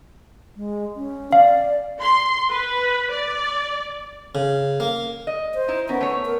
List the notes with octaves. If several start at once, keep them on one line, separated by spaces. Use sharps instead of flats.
G#3
C#4
D5 F5
C6
B4
D5
C#3
A#3
D#5
C5
D#4 E4
B3 C#4 A#4
A3 C#5
A#4